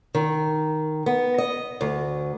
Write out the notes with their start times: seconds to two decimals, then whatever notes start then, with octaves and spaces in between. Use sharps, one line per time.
0.14 D#3
1.06 B3
1.38 D#5
1.81 D2